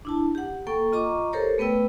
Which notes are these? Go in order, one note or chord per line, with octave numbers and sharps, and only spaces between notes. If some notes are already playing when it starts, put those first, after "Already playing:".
D4 E4 A5
G4 F#5
A#3 A4 G5 C#6
F4 D#5 A#5 C#6 D6
G4 A4 A#4 C5 C#5
A3 B3 B4 G5 E6